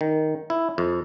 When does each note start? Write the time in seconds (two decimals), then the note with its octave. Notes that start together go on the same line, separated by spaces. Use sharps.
0.01 D#3
0.50 E4
0.78 F2